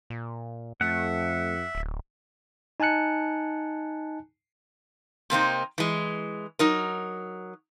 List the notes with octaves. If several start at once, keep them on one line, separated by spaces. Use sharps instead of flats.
A#2
F2 A3 E5 F#5
D1
D#4 G#5 A5 F#6 C#7
C3 A#3 C4 D#4
E3 G#3
F#3 D#4 A#4